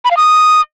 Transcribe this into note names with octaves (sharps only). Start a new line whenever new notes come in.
B5
F5
D#6